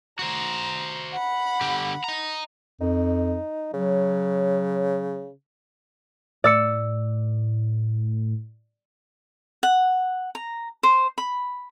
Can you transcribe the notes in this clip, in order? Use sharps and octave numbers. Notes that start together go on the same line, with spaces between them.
F#4 C5 A#5
F#5 B5
D3 G4
D#5 A#5
F2 D#4
C#3 F#3
A2 D5 E6 C#7
F#5
A#5
C5
B5